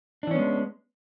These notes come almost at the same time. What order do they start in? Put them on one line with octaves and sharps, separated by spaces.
D4 E3 C#4 B3 G#3